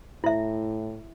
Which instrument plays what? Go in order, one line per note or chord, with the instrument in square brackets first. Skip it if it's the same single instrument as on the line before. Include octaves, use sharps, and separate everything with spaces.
[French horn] A2 [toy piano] E4 E5